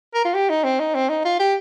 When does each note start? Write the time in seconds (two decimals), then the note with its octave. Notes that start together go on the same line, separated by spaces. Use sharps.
0.14 A#4
0.25 F4
0.35 G4
0.49 D#4
0.64 C4
0.80 D#4
0.95 C4
1.09 D#4
1.25 F4
1.39 G4